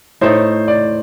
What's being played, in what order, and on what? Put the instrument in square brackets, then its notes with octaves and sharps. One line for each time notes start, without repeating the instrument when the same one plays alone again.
[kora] A2 A3 D#4 A4 [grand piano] C5
[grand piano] D5